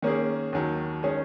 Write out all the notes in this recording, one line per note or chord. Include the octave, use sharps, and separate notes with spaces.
D#3 A#3 C#4 G#4
D#2 D#3 F#3
D#3 G#3 C#4 G#4